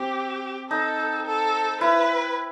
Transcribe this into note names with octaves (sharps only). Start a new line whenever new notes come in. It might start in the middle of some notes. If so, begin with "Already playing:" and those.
Already playing: C4 G4
D#4 A4
A4
E4 B4